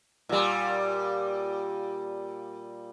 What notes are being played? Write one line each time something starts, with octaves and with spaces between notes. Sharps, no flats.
A#2 G3